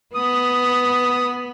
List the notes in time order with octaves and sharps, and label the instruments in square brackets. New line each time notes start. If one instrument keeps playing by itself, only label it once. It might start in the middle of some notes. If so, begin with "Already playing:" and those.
[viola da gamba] B3 [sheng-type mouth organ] D#6